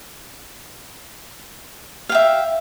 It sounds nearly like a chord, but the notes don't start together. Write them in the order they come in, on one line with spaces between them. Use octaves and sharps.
F5 G5 E5